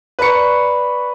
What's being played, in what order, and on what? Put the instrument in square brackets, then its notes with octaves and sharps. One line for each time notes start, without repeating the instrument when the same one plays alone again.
[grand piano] B4 C#7 [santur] D5 A#5 C#6